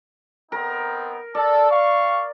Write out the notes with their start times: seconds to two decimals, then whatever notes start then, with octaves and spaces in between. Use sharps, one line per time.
0.52 B3 C4 D#4 A#4
1.35 A4 D5
1.70 F5 C#6